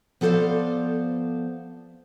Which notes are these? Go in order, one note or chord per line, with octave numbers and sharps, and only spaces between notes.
F3 B3 A4 C5 D5 F5